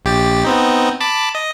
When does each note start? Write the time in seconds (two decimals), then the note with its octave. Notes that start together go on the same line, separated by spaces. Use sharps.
0.05 A#1 G4 A6
0.45 B3 C4 D#4
1.00 A5 B5 D6
1.35 D#5